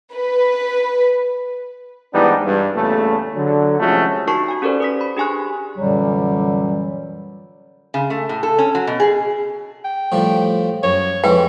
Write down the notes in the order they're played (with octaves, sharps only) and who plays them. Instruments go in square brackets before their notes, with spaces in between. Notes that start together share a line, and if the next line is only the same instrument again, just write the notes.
[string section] B4
[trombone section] G#2 E3 G3 B3 D4 D#4
G2
E2 A#2 C#3 A3
D3 F#3
C3 F3 G#3 A3 C#4 F#4
[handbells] D#4 F#4 A#4 A5 C#6 C7
F#4 G#5
C#4 G4 A4 A#4 C5 D5
B4 D#6 B6
B5
D4 G4 G#4 G#5 C#6 F#6
[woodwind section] F#2 A#2 D3 E3 F#3 G3
[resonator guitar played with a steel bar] C#3
A3
A2
A4
C#4
F#3
B2
G#4
[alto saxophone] G5
[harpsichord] A2 F3 G3
[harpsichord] F#2 [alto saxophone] C#5
[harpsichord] F2 G#3 E4 [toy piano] B4 G5